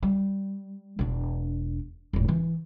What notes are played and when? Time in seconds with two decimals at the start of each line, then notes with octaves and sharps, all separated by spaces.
0.03 G3
0.99 E1 D4
2.13 E1 A1
2.28 E3